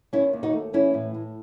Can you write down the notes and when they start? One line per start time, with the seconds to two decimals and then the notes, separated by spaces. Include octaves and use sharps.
0.13 D#3 C#4 E4
0.33 D#2
0.43 D#4 F#4
0.53 A3
0.73 E3 C#4 E4
0.94 A2
1.14 A2